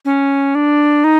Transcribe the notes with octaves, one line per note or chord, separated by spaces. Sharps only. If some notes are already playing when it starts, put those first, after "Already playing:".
C#4
D4
D#4